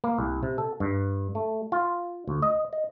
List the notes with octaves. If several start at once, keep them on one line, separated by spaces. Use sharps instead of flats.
A#3
C2
C3
A4
G2
A3
F4
D2
D#5
D#5